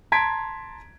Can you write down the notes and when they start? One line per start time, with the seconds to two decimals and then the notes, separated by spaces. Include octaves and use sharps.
0.12 A5 A#5 C6 G#6 B6 D7